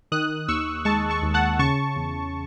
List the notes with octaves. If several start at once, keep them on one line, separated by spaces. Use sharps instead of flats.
D#3 D#6 F#6
D#2 C#6 E6
G#3 A5 C#6
A5 C#6
D#2
F#5 A5
C#3 A5 C#6
E2